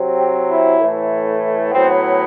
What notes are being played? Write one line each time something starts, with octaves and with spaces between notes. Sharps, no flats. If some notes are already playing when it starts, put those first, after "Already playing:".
Already playing: C3 F#3 C4
G4
E4
A2 E3 A3
A2 F#3 B3 C4